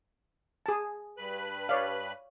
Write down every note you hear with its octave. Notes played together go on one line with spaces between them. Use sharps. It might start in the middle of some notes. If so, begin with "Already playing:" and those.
G#4 A5
G2 B4 F#6
C#5 D5 F5